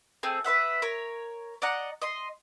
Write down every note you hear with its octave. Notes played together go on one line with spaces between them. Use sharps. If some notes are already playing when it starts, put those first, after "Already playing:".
A3 C4 G#4
B4 C5 E5 F#5
A#4 C#5
D5 D#5 F#5 A#5
D#5 C6